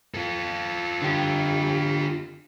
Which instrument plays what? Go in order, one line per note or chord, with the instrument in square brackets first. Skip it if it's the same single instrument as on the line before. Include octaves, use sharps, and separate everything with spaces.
[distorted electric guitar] F4 A4
[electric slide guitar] D3 G4